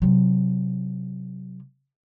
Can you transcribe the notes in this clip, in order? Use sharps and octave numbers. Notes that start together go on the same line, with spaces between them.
C3 F#3